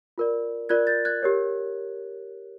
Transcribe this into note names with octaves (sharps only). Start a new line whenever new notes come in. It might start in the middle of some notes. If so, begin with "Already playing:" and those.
F4 A#4 D5
F4 A#4 D5 F#6 G#6
G6 A6
F#6 G#6
G4 A#4 C#5